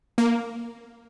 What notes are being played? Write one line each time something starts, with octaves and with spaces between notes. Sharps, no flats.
A#3